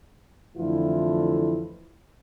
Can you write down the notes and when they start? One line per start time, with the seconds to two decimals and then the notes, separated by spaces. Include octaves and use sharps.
0.55 F2 D3 E3 A3 E4 F4